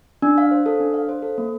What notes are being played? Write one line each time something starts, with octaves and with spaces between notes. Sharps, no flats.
D4
F5
C5
A4
D4
F5
C5
A4
A#3